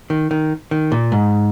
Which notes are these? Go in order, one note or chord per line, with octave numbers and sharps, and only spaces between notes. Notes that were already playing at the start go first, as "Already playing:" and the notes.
D#3
D#3
D#3
A#2
G#2